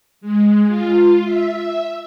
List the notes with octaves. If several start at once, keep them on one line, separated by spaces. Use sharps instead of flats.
G#3
F4
E5